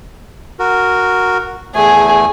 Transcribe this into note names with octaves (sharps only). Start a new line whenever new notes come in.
F#4 A#4
E2 A3 G#4 G#5